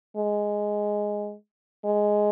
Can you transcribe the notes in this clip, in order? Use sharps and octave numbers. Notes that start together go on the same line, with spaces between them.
G#3
G#3